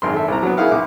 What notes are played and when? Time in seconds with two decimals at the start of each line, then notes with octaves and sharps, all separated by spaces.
0.02 G#1 F#2 C6
0.14 A4 E5
0.28 C2 A#5
0.43 F#3 B3
0.57 E4 G#4 A#4 F5 F#5
0.71 B1 D6